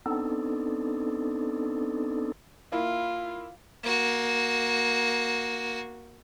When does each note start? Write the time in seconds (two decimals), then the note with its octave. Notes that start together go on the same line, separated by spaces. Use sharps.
0.06 B3 C4 D4 D#4 A4
2.72 A#3 E4 F4
3.84 A#3 F#4